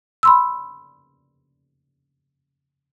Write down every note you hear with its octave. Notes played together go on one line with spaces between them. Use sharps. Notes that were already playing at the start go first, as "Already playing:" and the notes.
B5 C6 E6